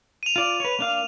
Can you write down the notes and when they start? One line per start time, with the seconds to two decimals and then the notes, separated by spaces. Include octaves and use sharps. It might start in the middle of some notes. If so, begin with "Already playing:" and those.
0.23 D#7 F7
0.36 F4 D5
0.60 B4 C#5
0.79 A#3 D4 F5